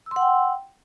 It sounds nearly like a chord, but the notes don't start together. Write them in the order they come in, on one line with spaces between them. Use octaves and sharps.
E6 C6 F#5 G5